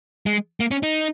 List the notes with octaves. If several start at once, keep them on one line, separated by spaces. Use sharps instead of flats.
G#3
A#3
C#4
D#4